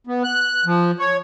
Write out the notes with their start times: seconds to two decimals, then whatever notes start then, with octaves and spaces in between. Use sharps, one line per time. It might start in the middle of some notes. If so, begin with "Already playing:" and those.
0.07 B3
0.24 F#6
0.66 F3
0.99 C#5